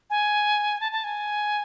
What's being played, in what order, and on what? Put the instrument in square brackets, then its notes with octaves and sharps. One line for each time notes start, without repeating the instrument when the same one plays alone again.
[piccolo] G#5
A5
A5
G#5